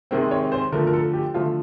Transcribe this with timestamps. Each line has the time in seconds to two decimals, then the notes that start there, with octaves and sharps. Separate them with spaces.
0.11 C3 D#3 G#3 C4
0.31 C#5
0.52 C5
0.72 D3 F3 A3 A#4
0.87 A#4
0.93 A4
1.14 G4
1.34 D3 F3 A3 F4